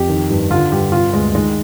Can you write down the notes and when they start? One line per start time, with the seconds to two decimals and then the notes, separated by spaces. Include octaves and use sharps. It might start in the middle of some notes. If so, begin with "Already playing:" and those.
Already playing: F2 G4
0.09 D#3
0.30 G2
0.50 D3 F4
0.72 G2 G4
0.92 C3 F4
1.13 D2 G#3
1.35 D#3 G#3